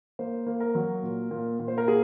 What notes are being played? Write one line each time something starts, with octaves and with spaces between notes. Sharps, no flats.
A#3 C5
A#3
A#4
F#3
A#2
A#2
A#2
C5
A#4
A#3 G#4